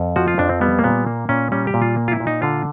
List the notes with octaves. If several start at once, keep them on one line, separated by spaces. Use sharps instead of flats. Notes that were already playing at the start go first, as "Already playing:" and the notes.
Already playing: F2
F3 F#4
F4
F2 D4
C4
G3 B3
A#3
A#2 B3
A#3
A#2 C#4
G3 C#4
G4
A#2
F4
A#3
F4
E4
A#2
D#4
D3 F4